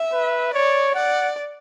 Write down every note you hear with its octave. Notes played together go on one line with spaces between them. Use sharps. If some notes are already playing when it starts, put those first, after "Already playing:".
Already playing: E5
B4
C#5 D5
D5 F#5